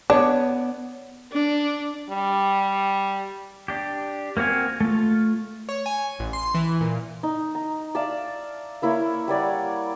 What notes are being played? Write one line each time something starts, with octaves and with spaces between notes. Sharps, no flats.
B3 D4 C#5 D5
D4
G3
D4 G4
A#3 C4 F#4 F5 G#5
A3 F4
C#5
G#5
A1
C6
E3
A#2
D#4
A#5
D5 E5 F5 A5
A#3 E4 A#4 C#5
G3 C#5 D5 F#5